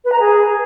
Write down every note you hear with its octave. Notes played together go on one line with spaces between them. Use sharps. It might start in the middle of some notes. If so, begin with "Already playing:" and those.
B4
A#5
G#4